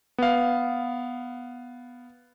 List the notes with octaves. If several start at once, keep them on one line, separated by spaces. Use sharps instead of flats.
B3 F5